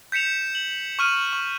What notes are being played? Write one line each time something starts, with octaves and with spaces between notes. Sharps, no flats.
G6 B6 C#7 E7 F7
F#7
C#6 F6 D#7
C#6